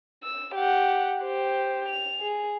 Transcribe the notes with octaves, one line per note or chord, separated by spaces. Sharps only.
E6
G4 F#5
G4 C5
F7
G#4